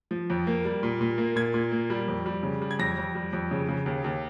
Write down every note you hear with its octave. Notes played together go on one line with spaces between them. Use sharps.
F3
F2
A#3
G3
A#2
A#2
A#3
A#2 G#6
A#2
A#3
G3
F2
G3
C#3
G3
G#6
F2 A#6
F2
G3
F2
C#3
C#3
D#2
D#2